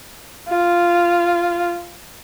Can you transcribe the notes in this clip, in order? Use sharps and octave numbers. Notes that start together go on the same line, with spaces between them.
F4